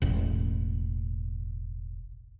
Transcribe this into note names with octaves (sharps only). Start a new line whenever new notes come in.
E1 A1